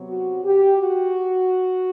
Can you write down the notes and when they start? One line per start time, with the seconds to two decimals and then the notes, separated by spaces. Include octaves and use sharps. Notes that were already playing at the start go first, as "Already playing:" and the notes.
Already playing: C3 F#3 B3
0.10 F#4
0.44 G4
0.77 F#4